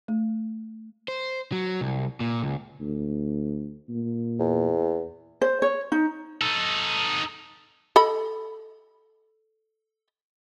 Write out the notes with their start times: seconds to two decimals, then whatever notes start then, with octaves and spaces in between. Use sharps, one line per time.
0.08 A3
1.08 C5
1.52 F#3
1.81 C2
2.20 A#2
2.43 C#2
2.81 D2
3.89 A#2
4.39 E2
5.41 C5
5.62 C#5
5.92 D#4
6.41 D#4 A4
7.96 A4 D#5 B5